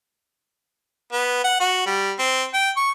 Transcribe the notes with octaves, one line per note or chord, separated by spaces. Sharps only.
B3
F#5
F#4
G3
C4
G5
C#6